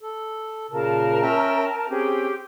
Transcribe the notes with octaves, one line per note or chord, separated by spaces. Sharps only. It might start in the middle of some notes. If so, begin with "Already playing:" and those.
A4
A#2 C#3 A#4 A5
C#4 E5 G5
C4 C#4 G4 G#4